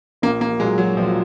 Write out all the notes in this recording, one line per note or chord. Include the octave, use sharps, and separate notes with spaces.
A#1 A#3
A#3
A#2 F#3 G#3
F#3
A#1 F3